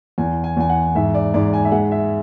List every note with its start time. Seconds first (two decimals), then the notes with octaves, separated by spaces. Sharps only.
0.18 E2 G#5
0.44 G#5
0.57 E2 G#5
0.69 F#5
0.95 G#2 E5
1.14 D5
1.34 G#2 D5
1.53 G#5
1.65 E5
1.72 G#3 F#5
1.91 E5